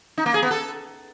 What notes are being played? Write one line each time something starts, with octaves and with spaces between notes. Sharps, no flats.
D#4
A#3
G#4
B3
A4